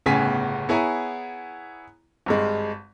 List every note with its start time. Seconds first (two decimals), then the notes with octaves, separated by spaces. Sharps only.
0.06 G1 A2 C#3 B3 G#5 B6
0.69 B3 E4 G#4 C#5 G#5 A#5
2.26 G#1 G2 G#3